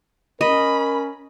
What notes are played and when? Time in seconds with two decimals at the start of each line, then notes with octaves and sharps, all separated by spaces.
0.41 C#4 A#4 D#5 B5